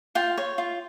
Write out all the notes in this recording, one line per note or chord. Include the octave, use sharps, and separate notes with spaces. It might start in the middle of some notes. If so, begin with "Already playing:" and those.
F4 G5
C#5
F4